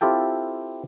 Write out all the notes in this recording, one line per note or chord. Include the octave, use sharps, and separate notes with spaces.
C4 E4 F4 G4 A4 G5